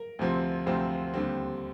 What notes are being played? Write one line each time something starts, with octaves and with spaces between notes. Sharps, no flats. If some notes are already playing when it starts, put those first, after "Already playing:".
Already playing: A#4
D2 C3 F3 C4
D2 C3 F3 C4 C5
D#2 D3 G3 C4